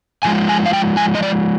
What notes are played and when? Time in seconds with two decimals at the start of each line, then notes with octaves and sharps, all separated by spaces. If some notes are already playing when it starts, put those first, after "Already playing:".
0.23 G#2 F3 G#3 G#5
0.49 G#5
0.66 F5
0.73 G5
0.97 G#5
1.15 D#5
1.23 D5